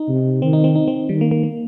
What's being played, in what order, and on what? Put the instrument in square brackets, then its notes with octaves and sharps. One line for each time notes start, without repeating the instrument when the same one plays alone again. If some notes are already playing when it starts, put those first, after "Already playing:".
Already playing: [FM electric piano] D#4
[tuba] C3
[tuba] D#3 [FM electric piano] C4
[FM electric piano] D#4
C4
D#4
C4
[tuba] D#3 [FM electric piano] G3
[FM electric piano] A#3
A#3
A#3